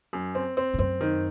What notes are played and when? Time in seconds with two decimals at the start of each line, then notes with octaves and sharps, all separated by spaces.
0.13 F#2
0.35 C4
0.57 C4
0.74 A2
0.79 F#2 C4
1.01 D#3